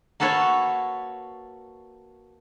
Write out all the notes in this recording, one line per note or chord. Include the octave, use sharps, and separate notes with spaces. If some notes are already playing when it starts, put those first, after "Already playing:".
A#3 F#4 A4 B4 C#5